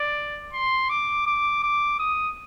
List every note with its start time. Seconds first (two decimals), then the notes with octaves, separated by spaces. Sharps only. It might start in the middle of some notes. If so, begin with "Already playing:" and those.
Already playing: D5
0.53 C6
0.89 D6
1.26 D6
1.63 D6
1.99 D#6